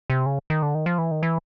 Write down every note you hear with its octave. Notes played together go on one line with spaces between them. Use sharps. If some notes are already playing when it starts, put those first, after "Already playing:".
C3
C#3
D#3
D3
D#3
F3
E3
D#3
E3